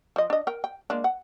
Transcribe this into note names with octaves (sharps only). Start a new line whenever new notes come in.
F3 D#5
D4 D#5
A#4 G5
G5
G#3 A#3 D4
F#5